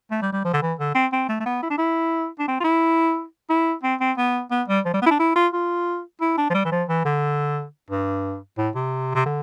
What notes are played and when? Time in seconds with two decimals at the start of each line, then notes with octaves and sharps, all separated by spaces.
0.11 A3
0.22 G3
0.32 G3
0.45 F3
0.53 D3
0.62 E3
0.79 D3
0.95 C4
1.12 C4
1.29 A3
1.40 A3
1.46 B3
1.62 E4
1.70 D4
1.78 E4
2.39 D4
2.48 C4
2.60 F4
2.64 E4
3.49 E4
3.83 C4
4.00 C4
4.17 B3
4.51 B3
4.68 G3
4.85 F3
4.94 G3
5.02 B3
5.06 E4
5.11 D4
5.19 E4
5.36 F4
5.53 F4
6.21 E4
6.38 D4
6.50 F3
6.54 G3
6.65 E3
6.72 F3
6.89 E3
7.05 D3
7.90 G2
8.58 A2
8.75 C3
9.15 C3
9.26 D3